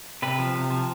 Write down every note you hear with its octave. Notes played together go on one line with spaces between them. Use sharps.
C3 B4
F3
C3
F3